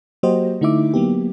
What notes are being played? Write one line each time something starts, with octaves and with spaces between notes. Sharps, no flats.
F#3 A#3 F#4 G4 C5 D#5
D3 A3 D#4 E4 E5 D6
F#3 A#3 B3 G4